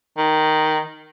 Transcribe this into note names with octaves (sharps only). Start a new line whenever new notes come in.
D#3